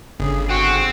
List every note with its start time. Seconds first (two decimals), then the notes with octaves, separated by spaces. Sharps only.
0.20 G1 C#3 G#4
0.49 C4 F#4 G#4 F#5